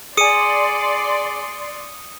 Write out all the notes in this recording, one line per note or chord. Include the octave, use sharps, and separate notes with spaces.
G#4 D5 G#5 C6 D#6 C#7 D#7